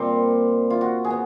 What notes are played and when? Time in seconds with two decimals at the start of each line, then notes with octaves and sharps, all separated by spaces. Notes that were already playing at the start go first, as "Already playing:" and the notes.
Already playing: A#2 G3 C4 C5
0.70 F4
0.81 F#4
1.05 G#4
1.10 B3